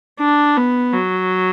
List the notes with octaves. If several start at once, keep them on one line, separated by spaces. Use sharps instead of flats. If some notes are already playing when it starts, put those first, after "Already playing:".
D4
B3
F#3